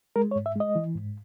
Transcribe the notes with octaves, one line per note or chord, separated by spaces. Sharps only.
G#3 A#4
C#5
G#2
E5
G#3 D#5
E3
G#2